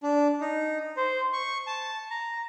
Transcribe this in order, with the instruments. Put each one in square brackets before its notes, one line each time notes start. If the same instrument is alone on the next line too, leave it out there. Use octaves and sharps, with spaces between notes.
[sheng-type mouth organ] D4
D#4
C5
C#6
A5
A#5